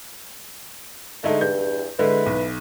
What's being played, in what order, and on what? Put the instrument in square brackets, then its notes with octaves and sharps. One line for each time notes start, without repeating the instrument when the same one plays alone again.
[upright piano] D3 G#3 D#4 [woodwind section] A3
[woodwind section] E2 G2 [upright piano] G6
[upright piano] D3 G#3 [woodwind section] B3 E4 B4
[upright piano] B1